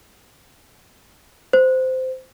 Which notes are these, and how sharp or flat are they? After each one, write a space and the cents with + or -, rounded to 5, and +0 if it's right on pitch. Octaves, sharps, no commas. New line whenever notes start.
C5 -15